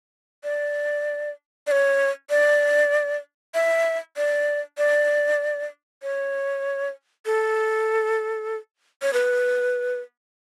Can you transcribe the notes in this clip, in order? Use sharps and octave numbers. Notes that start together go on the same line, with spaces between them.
D5
D5
C#5
D5
E5
D5
D5
C#5
A4
C#5
B4